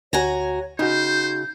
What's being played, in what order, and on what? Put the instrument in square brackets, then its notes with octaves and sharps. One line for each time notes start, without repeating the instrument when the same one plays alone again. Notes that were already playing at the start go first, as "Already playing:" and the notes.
[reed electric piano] D2 [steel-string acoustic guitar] F#4 G#5 A#5 [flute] C#5
[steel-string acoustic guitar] C#3 [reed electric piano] D#4 F#4 [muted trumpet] C5 [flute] G6